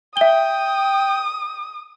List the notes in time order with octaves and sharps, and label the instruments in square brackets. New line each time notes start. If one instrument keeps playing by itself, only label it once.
[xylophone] E5 G7 [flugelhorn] G5 [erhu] D#6